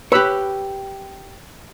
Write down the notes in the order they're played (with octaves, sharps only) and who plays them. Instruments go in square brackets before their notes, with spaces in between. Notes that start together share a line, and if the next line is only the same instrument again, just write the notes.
[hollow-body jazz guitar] G4 C#5 [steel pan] B4 B5 E6